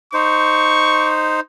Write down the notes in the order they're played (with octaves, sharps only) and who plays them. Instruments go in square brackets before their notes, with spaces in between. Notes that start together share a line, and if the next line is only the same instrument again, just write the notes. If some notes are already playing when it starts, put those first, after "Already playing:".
[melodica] D#4 C5 [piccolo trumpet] C#6